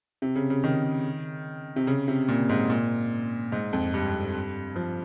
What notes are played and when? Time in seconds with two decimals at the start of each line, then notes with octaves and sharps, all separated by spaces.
0.22 C3
0.36 C#3
0.50 C#3
0.64 D#3
1.76 C3
1.87 C#3
2.08 C3
2.28 A#2
2.49 G#2
2.70 A#2
3.52 G#2
3.73 F2
3.94 G2
4.76 F3